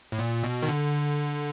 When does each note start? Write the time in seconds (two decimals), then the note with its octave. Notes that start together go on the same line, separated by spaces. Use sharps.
0.12 A2
0.19 A#2
0.43 B2
0.63 D#3
0.68 D3